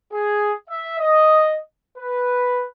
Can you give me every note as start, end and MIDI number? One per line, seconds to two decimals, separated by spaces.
0.13 0.53 68
0.70 0.97 76
1.00 1.58 75
1.97 2.66 71